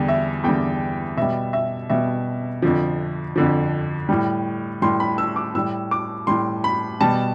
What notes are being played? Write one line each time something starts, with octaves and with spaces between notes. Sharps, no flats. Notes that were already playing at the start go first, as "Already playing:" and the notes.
Already playing: E2 D3 G3
E5
E2 D3 G3 G5
B2 G3 E5
E5
B2 G3 E5
F2 D3 F3
F2 D3 F3
A2 G3
A2 G3 C6
B5
E6
D6
A2 G3 E6
D6
A2 G3 C6
B5
B2 G3 A5